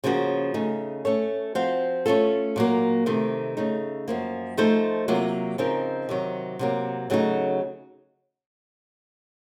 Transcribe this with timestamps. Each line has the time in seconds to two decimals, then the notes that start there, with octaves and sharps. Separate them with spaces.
0.04 C#3 F3 A#3 C#4 F#4
0.54 C#3 A3 D#4
1.05 A3 C#4 A4 C#5
1.55 F3 C4 F#4 C5 F5
2.06 A3 C#4 F4 A4
2.56 A#2 F#3 A#3
3.06 C3 D#3 A3 C4
3.57 C#3 A3 D#4
4.08 F#2 F3 A#3
4.57 F3 A3 D#4 A4 C5
5.08 C3 F#3 A#3 F4
5.58 C#3 F3 C4 D#4 A#4
6.09 C3 D#3 F#3
6.59 C3 F#3 A#3
7.10 C#3 F#3 A3 D#4 F#4